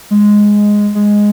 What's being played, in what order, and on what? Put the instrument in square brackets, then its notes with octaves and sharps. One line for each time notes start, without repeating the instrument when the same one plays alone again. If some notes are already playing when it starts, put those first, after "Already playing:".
[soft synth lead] G#3
G#3